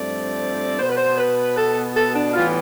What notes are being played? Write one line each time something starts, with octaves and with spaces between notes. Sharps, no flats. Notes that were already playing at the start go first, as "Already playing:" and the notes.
Already playing: G2 F3 A3 C4 D5
B2 B3 C5
B4
C5
B4
A4
A4
D4
A2 E3 G3 B3 F4